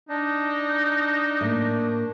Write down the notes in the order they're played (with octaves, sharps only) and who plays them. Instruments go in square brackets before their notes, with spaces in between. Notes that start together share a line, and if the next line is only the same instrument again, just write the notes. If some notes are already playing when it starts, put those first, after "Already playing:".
[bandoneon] D4 [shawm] D#4
[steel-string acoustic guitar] A2 A#3